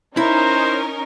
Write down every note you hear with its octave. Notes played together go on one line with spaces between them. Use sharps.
C#4 D#4 E4 A#4 C5